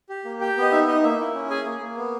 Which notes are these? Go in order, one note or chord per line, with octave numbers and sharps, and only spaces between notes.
G4
A#3
G4 G5
B3 D#5
D#4 E5
D#4 D#5
A#3 E5
E4
C#4
G#4 G#5
A#3
A#3
B3